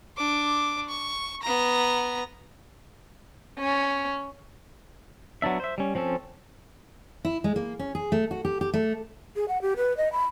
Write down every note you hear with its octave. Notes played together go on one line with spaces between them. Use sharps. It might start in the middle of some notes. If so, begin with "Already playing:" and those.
D4 D6
C#6
B3 A#5
C#4
F#3 B3 D4 E5
C5 E5
G3 C#4
F3 C4 C#4 A4
E4
G#3
A#3
C#4
G#4
A3
F#4
G4
G4
A3
G#4
F#5
G4
B4
D#5
B5